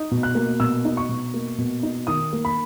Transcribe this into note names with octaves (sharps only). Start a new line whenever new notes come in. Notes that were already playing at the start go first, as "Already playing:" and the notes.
Already playing: D#4
B2
F#6
A#3
B2 E6
D#4
C#6
B2
A#3
B2
D#4
D#3 D#6
A#3
B5